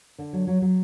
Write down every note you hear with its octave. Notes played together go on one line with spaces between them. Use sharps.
D3
F#3
F#3
F#3